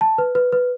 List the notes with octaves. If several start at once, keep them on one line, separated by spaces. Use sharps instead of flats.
A5
B4
B4
B4